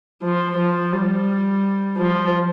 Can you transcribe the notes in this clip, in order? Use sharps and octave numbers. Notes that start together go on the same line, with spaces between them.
F3
F3
G3
F3